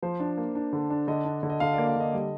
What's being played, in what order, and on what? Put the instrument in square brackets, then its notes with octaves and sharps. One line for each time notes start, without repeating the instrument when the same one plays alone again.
[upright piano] F3 [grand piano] C5
[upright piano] D4
A#3
D4
D3
D4
[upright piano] D3 [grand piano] D#5
[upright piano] D4
D3
[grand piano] D#5
[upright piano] D3 [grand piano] F5
[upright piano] A#3 [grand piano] D5
[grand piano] F5
[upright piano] D3 [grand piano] D#5
[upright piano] G3